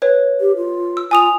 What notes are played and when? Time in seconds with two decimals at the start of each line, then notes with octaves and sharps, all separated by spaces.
0.02 B4 C#5
0.41 G4
0.56 F4
0.97 E6
1.11 F4 G#5 D#6 F7